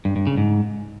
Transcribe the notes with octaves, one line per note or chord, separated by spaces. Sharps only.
G2
G2
C#3
G#2